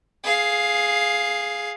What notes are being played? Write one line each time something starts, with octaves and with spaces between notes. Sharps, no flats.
G#4 F5